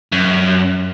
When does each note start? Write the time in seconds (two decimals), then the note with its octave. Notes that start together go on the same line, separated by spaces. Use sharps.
0.12 F#2